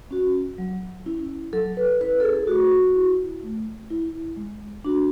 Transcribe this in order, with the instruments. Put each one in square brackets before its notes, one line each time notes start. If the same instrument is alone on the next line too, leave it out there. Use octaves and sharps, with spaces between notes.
[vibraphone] C#4 F#4
F#3
C#4 E4
F#3 A4
B4
C#4 E4 B4
A4
G#4
A3 F#4
E4
A3
E4
G#3
D4 F#4